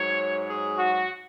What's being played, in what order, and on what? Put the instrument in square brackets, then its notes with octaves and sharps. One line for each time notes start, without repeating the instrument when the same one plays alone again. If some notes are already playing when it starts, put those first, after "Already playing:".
Already playing: [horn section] G#2 F#3 C#5
G#4
F#4